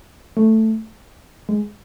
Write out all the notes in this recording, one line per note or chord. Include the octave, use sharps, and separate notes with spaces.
A3
G#3